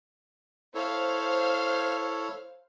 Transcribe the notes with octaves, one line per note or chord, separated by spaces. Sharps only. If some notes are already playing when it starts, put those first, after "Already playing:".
E4 A4 C5 C#5 F5 F6